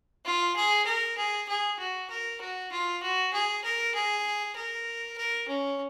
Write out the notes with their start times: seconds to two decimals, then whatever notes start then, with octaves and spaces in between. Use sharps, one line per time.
0.25 F4
0.56 G#4
0.86 A#4
1.17 G#4
1.48 G#4
1.79 F#4
2.10 A#4
2.41 F#4
2.71 F4
3.02 F#4
3.33 G#4
3.64 A#4
3.95 G#4
4.56 A#4
5.17 A#4
5.48 C#4